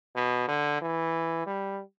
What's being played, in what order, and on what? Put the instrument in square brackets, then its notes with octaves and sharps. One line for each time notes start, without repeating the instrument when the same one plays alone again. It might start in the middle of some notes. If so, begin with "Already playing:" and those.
[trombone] B2
D3
E3
G3